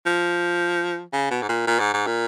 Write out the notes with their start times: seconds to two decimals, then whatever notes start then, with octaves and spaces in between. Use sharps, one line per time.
0.06 F3
1.13 C#3
1.30 B2
1.42 G#2
1.49 A#2
1.67 A#2
1.79 G#2
1.93 G#2
2.07 A#2